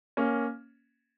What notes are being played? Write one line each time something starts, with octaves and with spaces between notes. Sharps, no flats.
A#3 C#4